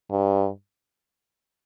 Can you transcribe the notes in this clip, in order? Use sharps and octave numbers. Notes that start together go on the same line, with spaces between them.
G2